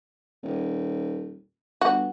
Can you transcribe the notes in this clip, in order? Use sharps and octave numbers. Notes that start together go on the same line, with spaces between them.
D#1
G1 F#4